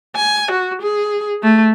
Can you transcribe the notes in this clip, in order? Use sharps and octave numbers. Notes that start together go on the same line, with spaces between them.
G#5
F#4
G#4
A3